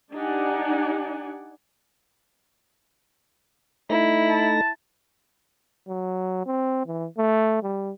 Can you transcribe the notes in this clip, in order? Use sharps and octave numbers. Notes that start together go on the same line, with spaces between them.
D4 D#4 G4 D5 F#5 G#5
A3 D#4 E4 A#6
A5
F#3
C4
E3
A3
G3